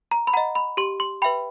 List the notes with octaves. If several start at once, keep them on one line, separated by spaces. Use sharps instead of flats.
A#5
B5
D#5 F#5 A#5
B5
G4 C6
C6
B4 E5 G5 B5